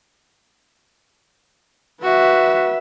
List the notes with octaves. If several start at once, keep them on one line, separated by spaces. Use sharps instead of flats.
F#4 B4 E5